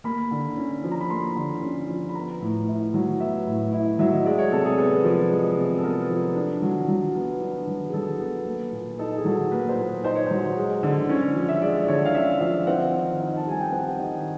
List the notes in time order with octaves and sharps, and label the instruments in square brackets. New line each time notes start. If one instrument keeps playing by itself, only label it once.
[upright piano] A#3 B5
D3
C#4
F3
A#5
B5
A#3 C6
D3
C#4
F3
B5
B3 A#5
A2
E4
F#3
B3 E5
A2
E4
F#3 E5
D#5
G#3 D5
C#5
C3 A4
G#4
B3
F3
G#3
C3
A4
B3 A#4
F3
D4
F#3
F#3
B3
D4
F#3
G#4
F#3 A4
B3
A#3
A#2
D#4 A4
G#4
F#3 A4
A#3 B4
C5
A#2 B4
D#4 C5
C#5
F#3 C5
G#3
D3
C#4 C#5
F3
E5
G#3 D5
D5
D3 C#5
F5
C#4 E5
F3 F5
C4 F#5
D#3
D#4
A5
G3 G#5
G5
C4 F#5
D#3